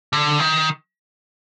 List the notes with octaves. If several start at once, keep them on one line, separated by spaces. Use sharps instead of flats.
D3
D#3